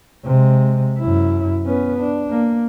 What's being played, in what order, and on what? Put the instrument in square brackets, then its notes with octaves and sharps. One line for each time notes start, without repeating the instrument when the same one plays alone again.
[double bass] C3 G#3
F#2 E4
B3 C#4
D4
A#3